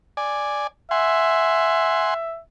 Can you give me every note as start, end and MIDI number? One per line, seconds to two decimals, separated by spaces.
0.17 0.67 74
0.17 0.67 80
0.91 2.40 76
0.91 2.14 78
0.91 2.14 80
0.91 2.14 84